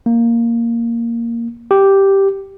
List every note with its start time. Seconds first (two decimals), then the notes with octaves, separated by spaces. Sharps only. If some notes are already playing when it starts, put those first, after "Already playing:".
0.06 A#3
1.71 G4